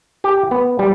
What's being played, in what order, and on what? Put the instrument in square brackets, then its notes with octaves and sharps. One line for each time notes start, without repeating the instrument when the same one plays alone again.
[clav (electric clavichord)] G4
B3
G3